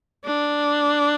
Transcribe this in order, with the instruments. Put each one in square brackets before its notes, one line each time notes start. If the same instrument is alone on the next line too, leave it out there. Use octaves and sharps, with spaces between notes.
[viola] D4